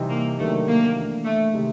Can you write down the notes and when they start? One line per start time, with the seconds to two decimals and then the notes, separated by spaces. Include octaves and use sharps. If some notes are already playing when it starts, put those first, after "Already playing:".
Already playing: C3 E3 G3 C4 D#4
0.10 A#3
0.39 C3 D#3 F#3 A3 A#3 D4
0.68 A#3
0.96 E3 A3 D4
1.25 A3
1.54 C3 D#3 G#3